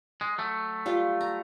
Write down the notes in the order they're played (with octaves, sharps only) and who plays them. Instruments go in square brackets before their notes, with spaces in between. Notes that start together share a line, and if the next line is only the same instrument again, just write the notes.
[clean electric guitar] G#3
F#3 A3
[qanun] G3 F4
A#5